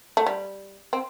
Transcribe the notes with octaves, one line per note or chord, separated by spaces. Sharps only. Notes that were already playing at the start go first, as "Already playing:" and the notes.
A3
G3
C4